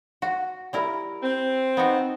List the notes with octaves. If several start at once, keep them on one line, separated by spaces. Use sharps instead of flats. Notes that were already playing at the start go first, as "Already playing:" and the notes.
F#4
G3 E4 A#4
C4
B3 D#4 F#4